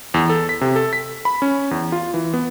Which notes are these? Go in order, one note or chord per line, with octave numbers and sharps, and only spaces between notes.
E2
A4
B6
C3
A4
B6
B5
C#4
E2
F4
E3
B3